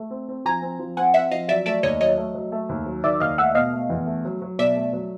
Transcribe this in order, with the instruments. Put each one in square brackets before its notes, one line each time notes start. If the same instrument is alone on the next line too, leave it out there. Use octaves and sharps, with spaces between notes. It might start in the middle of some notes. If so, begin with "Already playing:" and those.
Already playing: [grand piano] A3
C4
C4
[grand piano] F3 [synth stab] G#5 A#5
[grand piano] C4
F3
[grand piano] C4 [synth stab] F#5 G#5
[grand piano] C4 [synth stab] E5 F#5
[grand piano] F3 [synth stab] D#5 F5
[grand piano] F#3 [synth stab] D5 E5
[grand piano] A3 [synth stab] D5 E5
[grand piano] D#2 [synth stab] C#5 D#5
[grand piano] F#3 [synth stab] C#5 D#5
[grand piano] A3
F#3
A3
D#2
F#3
[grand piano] D#3 [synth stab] D5 E5
[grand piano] D#2 [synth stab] D#5 F5
[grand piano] A3 [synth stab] E5 F#5
[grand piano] B2 [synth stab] D#5 F5
[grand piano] A3
E2
A3
F#3
F#3
[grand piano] B2 [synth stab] D5 E5
[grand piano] A3
F#3